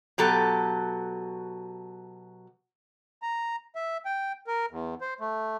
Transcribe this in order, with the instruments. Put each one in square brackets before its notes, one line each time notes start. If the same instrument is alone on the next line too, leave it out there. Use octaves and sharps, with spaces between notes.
[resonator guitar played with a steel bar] B2 F#3 G4 A4
[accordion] A#5
E5
G5
A#4
E2
C5
A3